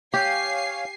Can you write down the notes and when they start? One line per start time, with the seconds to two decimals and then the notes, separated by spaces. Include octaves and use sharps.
0.14 G4 C#5 F5 G#5 C7